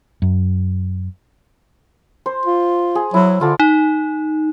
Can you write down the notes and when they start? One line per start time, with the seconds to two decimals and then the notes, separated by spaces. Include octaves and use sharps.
0.22 F#2
2.26 C5
2.46 F4
2.95 G#4
3.14 F#3 E4
3.41 D3 F4 A4 D5
3.60 D#4